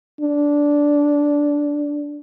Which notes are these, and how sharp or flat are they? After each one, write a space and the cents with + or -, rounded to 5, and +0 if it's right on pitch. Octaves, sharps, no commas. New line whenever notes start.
D4 -10